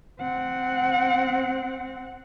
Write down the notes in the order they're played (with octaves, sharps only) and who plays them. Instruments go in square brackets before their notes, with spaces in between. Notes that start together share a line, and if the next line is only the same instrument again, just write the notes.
[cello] C4 F#5